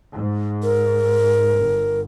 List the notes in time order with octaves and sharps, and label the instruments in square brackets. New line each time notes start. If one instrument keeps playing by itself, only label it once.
[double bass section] G#2
[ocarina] A#4
[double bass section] G1